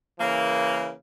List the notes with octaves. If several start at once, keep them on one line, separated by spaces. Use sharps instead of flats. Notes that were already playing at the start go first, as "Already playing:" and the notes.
C#3 E3 A#3